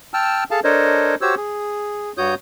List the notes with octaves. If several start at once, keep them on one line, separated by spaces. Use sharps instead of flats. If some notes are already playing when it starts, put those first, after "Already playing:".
G5 A5 E6 F6
G#4 A4 F5 A5
D4 A4 A#4 C5 C#5 D#5
F#4 G4 C5 C#5 E6
G#4
G2 F#4 C#5 D#6 G6